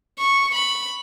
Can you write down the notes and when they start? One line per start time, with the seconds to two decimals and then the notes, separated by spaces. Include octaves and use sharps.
0.20 C#6
0.55 B5